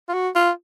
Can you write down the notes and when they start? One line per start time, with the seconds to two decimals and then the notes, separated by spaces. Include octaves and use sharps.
0.09 F4
0.13 F#4
0.35 F4